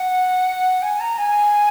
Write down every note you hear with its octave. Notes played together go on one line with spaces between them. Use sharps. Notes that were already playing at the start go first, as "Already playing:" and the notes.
Already playing: F#5
G#5
A#5
G#5